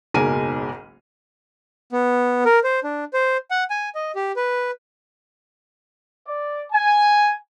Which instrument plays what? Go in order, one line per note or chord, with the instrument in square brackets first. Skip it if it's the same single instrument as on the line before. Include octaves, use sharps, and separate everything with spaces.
[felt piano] F#1 B1 G#2 A#4 G#5 D#7
[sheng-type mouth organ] B3
A#4
C5
D4
C5
F#5
G#5
D#5
G4
B4
[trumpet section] D5
G#5